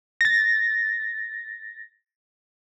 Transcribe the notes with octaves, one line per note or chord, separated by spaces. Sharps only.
A6 A#6